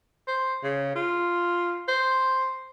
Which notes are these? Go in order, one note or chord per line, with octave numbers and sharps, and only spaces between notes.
C5
C#3
F4
C5